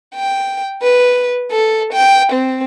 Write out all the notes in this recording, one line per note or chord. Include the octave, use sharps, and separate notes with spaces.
G5
B4
A4
G5
C4